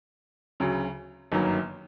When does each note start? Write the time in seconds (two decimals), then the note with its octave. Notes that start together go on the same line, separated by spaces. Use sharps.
0.60 D2 C#3 F#3
1.32 G1 F#2 D#3 F#3 A#3